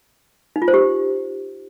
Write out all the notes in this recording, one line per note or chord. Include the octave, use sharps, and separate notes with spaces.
D#4
F4
C5
G4